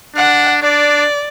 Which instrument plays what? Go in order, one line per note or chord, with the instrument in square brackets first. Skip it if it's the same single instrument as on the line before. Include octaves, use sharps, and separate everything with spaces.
[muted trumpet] D4 [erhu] F#5
[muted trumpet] D4 [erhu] D5